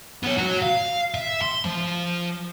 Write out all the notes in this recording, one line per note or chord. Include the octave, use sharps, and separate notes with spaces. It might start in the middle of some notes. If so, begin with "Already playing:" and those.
B3 C#5
F#4 C#5
F5
E5
C6
F3